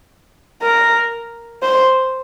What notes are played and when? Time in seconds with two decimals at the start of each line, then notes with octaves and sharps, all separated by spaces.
0.62 A#4
1.63 C5